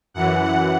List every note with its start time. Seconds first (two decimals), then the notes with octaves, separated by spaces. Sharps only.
0.14 F#2 E3 F#5
0.44 F#5